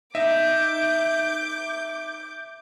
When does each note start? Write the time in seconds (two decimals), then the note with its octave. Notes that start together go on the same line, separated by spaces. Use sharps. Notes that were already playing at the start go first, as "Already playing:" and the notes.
0.15 D#4 E5 D6 G6